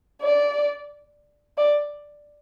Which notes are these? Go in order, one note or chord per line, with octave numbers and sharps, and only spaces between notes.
D5
D5